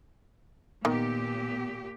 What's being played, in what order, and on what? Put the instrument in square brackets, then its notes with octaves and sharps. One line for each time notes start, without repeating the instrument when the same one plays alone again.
[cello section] A#2 G4 [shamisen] D#3 [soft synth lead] B3